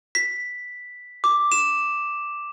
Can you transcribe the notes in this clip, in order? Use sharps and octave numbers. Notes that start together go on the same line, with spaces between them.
B6
D6
E7